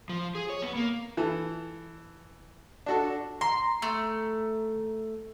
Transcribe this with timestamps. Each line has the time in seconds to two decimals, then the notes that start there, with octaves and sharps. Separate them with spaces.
0.09 F3
0.35 G#4
0.49 C#5
0.62 B3
0.76 A#3
1.17 E3 A4
2.86 D4 F#4 A4
3.41 A#5 C6
3.82 A3